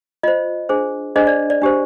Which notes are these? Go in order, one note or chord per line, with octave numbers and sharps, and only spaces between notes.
F4 C5 D#5
D4 G#4 C5
D4 G#4 C5 D#5
D5
D5
D4 G4 C5